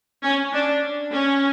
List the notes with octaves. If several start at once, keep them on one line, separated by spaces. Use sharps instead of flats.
C#4
D4
C#4